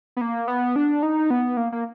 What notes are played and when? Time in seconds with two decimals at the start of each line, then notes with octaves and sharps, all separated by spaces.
0.17 B3
0.21 A#3
0.48 B3
0.76 D4
1.03 D#4
1.30 B3
1.57 A#3
1.72 A#3